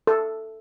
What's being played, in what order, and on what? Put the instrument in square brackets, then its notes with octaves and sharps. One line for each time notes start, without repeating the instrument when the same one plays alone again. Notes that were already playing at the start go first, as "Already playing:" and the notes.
[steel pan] A4